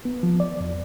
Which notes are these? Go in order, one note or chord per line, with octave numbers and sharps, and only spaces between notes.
B3
F3
D5
F2